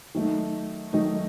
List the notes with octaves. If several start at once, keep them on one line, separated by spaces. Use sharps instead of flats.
D#3 F#3 A3 D#4
D#3 F#3 A3 D#4